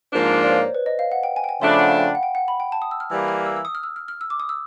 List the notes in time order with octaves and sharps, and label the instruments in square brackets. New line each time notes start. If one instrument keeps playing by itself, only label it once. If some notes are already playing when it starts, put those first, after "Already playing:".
[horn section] G#2 F3 A#3 D4 F4 [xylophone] C5
[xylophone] D5
C#5
C5
B4
D#5
F5
F#5
G5
G#5
G5
G#5
[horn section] C#3 F3 A3 D4 [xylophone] C6
[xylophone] B5
F#5
F5
G5
F#5
G5
F#5
B5
G5
A5
D#6
E6
F6
[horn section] E3 G3 A#3 [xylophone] E6
[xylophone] F6
E6
E6
D#6
F6
E6
F6
F6
E6
D6
D#6
E6